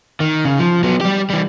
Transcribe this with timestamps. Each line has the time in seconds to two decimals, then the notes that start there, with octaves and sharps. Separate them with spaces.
0.20 D#3
0.45 C#3
0.59 F3
0.84 F#3 B3
1.01 G3 G4
1.30 E3 G3